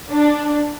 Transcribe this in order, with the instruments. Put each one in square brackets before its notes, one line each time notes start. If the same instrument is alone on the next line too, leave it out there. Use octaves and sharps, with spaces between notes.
[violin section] D4